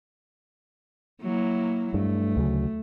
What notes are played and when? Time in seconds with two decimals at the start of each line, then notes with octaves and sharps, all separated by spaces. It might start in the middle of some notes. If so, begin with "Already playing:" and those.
1.21 F#3 A#3 E4
1.94 G2 A3
2.36 D2 C#3 F#3